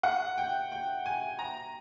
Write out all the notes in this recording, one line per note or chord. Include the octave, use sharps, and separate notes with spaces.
F#5
G5
G5
G#5
A#5